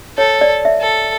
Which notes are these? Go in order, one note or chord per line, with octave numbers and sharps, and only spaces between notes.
A4 C#5
D5
E5
A4